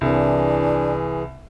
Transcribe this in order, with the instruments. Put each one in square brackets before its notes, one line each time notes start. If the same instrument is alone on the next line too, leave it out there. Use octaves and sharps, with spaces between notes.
[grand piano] C2 [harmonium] E3 G#4 [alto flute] D4